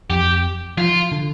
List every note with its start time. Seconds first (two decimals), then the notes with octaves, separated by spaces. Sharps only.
0.10 F2 G4
0.77 F3 F4
1.12 D3